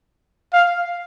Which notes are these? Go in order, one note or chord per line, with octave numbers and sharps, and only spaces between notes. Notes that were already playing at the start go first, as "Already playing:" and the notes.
F5